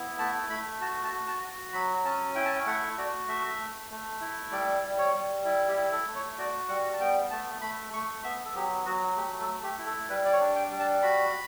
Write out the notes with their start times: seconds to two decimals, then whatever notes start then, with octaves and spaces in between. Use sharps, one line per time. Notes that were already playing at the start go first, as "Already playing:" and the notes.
Already playing: B3 E4
0.19 A3 A5
0.50 A3 B5
0.81 F#4 A5
1.04 A5
1.12 F#4
1.27 A5
1.43 F#4
1.73 F#3 B5
2.05 C#4 A5
2.35 E4 G5
2.45 A5
2.55 G5
2.66 A3 F#5
2.98 F#4 D5
3.28 A3 E5
3.59 A3
3.90 A3
4.21 E4
4.52 G3 D5
4.83 G3
4.98 C#5
5.14 G3
5.45 E4
5.68 G4
5.76 E4
5.92 A4
6.07 A3
6.15 C#5
6.38 F#4 D5
6.68 G3 F#5
6.93 A5
7.00 B3 G5
7.31 A3 A5
7.61 A3 B5
7.93 A3 C#6
8.23 B3 E5
8.45 A4
8.55 F#3 G4
8.86 F#3 F#4
9.16 A3 G4
9.40 A4
9.48 A3
9.63 G4
9.78 E4
9.86 A4
10.09 G3 B4
10.25 D5
10.33 C#5
10.40 D4
10.56 G5
10.71 G3
10.80 A5
11.02 F#4 B5